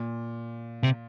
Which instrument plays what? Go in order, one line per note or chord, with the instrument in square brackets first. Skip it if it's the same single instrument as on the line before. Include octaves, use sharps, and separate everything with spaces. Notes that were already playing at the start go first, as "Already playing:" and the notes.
Already playing: [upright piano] A#2
[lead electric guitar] C3